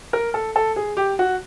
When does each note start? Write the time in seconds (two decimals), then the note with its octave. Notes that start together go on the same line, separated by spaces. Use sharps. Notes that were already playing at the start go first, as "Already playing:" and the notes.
0.13 A#4
0.34 A4
0.56 A4
0.76 G#4
0.97 G4
1.19 F#4